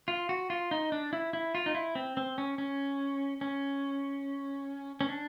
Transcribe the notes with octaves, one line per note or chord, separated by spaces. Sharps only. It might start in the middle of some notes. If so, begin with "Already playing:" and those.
F4
F#4
F4
D#4
D4
E4
E4
F4
D#4
E4
C4
C4
C#4
C#4
C#4
C#4
D4